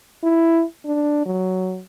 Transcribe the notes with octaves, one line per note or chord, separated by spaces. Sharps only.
E4
D4
F#3